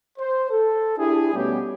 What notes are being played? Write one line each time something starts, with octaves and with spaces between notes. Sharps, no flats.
C5
A4
D4 E4 G4 G#4
B2 G3 A3 B3 C#4 G4